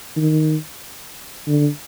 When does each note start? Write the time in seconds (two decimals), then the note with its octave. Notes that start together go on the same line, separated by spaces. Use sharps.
0.16 D#3
1.48 D3